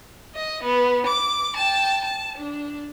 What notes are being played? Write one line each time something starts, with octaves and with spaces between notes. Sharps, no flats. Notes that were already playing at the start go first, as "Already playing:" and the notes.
D#5
B3
D6
G5 A5
A5
D4